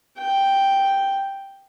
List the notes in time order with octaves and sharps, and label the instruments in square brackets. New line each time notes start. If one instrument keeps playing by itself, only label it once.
[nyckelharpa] G5